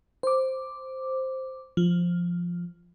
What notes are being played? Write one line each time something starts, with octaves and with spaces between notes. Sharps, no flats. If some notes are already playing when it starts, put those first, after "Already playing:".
C5 D6
F3